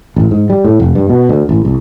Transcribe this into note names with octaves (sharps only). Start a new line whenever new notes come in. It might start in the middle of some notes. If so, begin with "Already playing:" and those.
A1
G#2
G3
A2
F1
G2
B2
D2
A1
C2